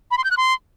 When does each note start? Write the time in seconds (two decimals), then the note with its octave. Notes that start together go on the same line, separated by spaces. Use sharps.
0.11 B5
0.18 C6
0.24 G6
0.31 F#6
0.37 C6